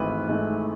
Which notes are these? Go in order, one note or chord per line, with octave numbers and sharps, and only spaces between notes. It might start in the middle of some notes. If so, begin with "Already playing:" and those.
Already playing: G#1 G#2 E3 A3 B4
G#2 E3 A3